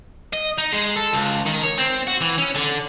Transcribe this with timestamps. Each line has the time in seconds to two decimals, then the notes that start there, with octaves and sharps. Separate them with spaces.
0.33 D#5
0.58 D#4
0.72 G#3
0.96 A4
1.13 C#2
1.46 D#3
1.64 C#5
1.78 C4
2.07 F#4
2.21 E3
2.38 C#4
2.55 D3